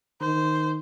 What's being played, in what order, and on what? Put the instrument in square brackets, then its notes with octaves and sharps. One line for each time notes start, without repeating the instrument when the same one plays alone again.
[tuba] D#3 [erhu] C5